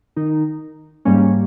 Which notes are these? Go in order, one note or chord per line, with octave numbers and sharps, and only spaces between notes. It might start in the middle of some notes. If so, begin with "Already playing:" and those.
D#3 D#4
G#2 G3 A#3 C#4